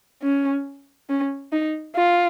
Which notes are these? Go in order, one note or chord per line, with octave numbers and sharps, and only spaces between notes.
C#4
C#4
D#4
F4